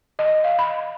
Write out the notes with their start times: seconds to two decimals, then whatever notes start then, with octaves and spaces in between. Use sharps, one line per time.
0.19 D#5
0.44 F5
0.59 B5